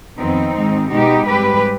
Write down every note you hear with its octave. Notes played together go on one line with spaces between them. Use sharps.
F2 D#3 B3 C4 D#4
G#2 D#3 G#3
B2 G#3 B3 D#4 G4
G#2 G3 C4 G4 B4